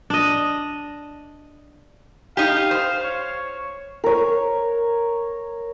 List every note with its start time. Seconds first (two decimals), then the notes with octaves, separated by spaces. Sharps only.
0.10 D4 D#5
2.37 D#4 G4 F5
2.71 C5
3.03 C#5
4.04 A#4 C#5